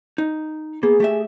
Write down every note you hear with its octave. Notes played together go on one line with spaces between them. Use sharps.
D#4
A#3 B3 G#4
A3 G4 E5